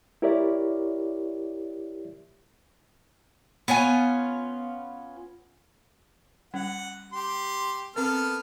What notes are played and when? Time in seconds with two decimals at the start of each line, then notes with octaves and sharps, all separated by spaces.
0.22 E4 G4 A#4 C#5 D5 E5
3.68 B3 C#4 F4 G#5
6.54 G3 C#4 F#5
7.12 G4 C6
7.96 B3 C4 A4 A#4 F6